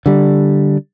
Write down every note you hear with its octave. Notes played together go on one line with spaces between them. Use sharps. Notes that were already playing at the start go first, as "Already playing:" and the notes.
D3 G3